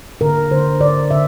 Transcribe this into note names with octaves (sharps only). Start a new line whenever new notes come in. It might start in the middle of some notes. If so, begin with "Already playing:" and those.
D3 A#4
D3 C5
D3 D5
D3 E5